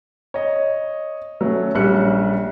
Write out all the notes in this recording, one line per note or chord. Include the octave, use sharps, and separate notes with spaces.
C#5 D#5
F#3 A3 C#4
A#1 G3 C#4 F#6 C#7